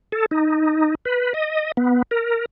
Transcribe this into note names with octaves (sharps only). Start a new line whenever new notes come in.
A4
D#4
B4
D#5
B3
A#4